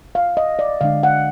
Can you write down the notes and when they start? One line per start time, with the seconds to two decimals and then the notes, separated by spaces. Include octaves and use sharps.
0.15 F5
0.37 D#5
0.59 D5
0.81 D3 G#3 D4 F5
1.03 F#5